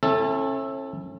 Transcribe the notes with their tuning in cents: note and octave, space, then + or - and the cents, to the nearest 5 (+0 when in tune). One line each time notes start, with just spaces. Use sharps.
C#4 -40 E4 +0 A4 +0